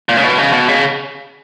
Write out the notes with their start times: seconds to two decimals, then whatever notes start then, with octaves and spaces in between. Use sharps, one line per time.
0.09 A#2
0.17 C#3
0.24 B2
0.38 C#3
0.53 B2
0.68 C#3